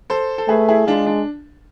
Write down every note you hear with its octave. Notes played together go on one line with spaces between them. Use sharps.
A4 C5
A4
A3 G#4 B4
E4 G#4
G#3 D4 F4
D4